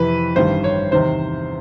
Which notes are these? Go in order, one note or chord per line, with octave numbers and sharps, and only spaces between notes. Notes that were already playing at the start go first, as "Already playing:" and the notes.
Already playing: F2 C3 E3 B4
A1 G2 D#3 G3 C5
C#5
E2 C3 D#3 C5